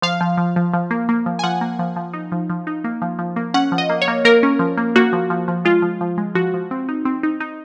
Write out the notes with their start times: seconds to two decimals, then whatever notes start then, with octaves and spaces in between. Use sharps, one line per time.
0.02 F3 F5
0.21 F3
0.38 F3
0.56 F3
0.74 F3
0.91 A#3
1.09 A#3
1.26 F3
1.39 G#5
1.44 F3 F#5
1.61 A#3
1.79 F3
1.96 F3
2.13 D#4
2.32 F3
2.50 F3
2.67 D#4
2.84 A#3
3.02 F3
3.19 F3
3.36 A#3
3.54 C#4 F#5
3.72 F3
3.78 D#5
3.89 A#3
4.02 C#5
4.08 A#3
4.25 A#3 A#4
4.43 C#4
4.59 F3
4.77 A#3
4.96 A#3 F#4
5.13 F3
5.30 F3
5.48 F3
5.65 G#3 F4
5.82 F3
6.01 F3
6.18 G#3
6.35 F3 F#4
6.54 F3
6.71 C4
6.89 D#4
7.05 C4
7.23 D#4
7.40 D#4